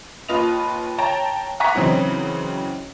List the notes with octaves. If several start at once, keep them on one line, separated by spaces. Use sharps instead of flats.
D#2 F4 B4 D#5 F7
C#5 G5 A5 A#5
F#5 G#5 A#5 C#6 B6
C#3 E3 F#3 C4 D#4